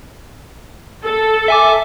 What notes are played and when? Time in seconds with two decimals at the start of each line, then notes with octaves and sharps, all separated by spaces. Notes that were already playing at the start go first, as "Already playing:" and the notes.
1.06 A4
1.48 E5 G#5 D6